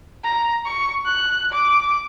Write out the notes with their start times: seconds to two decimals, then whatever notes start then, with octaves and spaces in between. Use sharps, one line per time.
0.24 A#5
0.65 C#6
1.06 F#6
1.52 D6